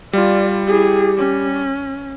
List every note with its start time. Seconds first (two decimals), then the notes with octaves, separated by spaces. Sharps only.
0.13 G3 F4 D5
0.67 E4 G4 G#4
1.17 C#4